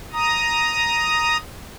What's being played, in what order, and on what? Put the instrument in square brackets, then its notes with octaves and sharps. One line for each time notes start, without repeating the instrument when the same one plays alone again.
[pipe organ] A#5 D#6